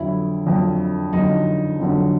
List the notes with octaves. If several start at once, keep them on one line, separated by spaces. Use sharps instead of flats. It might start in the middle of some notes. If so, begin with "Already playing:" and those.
Already playing: F2 D3 F#3 E4
F2 D3 F#3
F2 D3 F#3 D#4
F2 D3 F#3